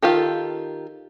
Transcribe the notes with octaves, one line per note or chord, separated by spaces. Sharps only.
D#3 F#3 F4 G4 A4